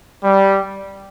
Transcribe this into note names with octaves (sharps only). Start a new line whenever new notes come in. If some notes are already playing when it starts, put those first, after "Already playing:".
G3